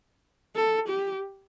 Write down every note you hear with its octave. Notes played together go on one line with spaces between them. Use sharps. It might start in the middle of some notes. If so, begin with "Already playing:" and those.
A4
G4